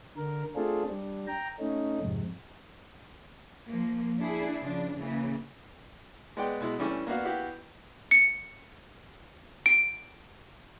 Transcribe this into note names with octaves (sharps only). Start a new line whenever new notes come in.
D3 A#4
A3 C4 D4 F4 G#4 A4
G3 D4
G5 A#5
A3 C#4 D#4
F2 G#2 C3
F3 A#3
D4 E4 G#4
C#3 F3 D4
C#3 E3 A#3
G#3 B3 D5 G5
B2 G#3 E4
E3 G3 A3 C#4 D4
A#3 B3 D4 F#4 F5
B3 E4 F#4 G4 F5
C#7
D7